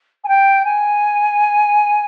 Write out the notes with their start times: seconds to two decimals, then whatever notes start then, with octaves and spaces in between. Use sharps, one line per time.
0.24 G#5
0.28 G5
0.65 G#5